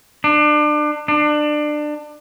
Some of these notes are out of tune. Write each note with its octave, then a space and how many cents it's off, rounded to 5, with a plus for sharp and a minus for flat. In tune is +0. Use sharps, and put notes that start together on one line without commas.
D4 +30
D4 +25